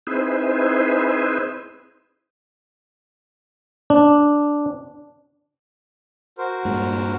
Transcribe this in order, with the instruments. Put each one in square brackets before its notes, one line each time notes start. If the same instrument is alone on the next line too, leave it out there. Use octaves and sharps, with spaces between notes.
[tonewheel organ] C4 D#4 E4 G#4 B4 C5
[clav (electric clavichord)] D4
[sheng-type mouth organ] F#4 A#4 C5
[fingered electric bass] G2 A#2 G#3